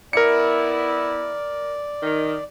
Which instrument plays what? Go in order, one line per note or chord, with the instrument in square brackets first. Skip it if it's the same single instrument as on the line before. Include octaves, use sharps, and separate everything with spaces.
[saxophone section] B3 E4 [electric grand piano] A#4 C#7 [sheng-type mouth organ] D5
[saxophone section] D#3